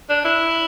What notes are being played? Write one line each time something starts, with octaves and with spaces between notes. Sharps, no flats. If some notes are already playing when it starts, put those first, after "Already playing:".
D4
E4